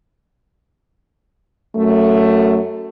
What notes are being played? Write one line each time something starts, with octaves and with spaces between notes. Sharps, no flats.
F#2 A3